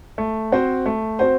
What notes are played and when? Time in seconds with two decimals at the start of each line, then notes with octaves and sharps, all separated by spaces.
0.18 A3
0.52 C4 F#4 C5
0.86 A3
1.19 C4 F#4 C5